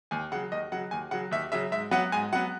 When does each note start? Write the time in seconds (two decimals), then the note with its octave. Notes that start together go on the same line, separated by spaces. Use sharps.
0.11 D#2 G#5
0.32 C#3 F#3 F#5
0.52 D#2 D#5
0.72 C#3 F#3 F#5
0.91 D#2 G#5
1.11 C#3 F#3 F#5
1.31 D#2 E5
1.52 C#3 F#3 E5
1.72 G#2 E5
1.91 F#3 B3 F#5
2.12 G#2 G#5
2.33 F#3 B3 F#5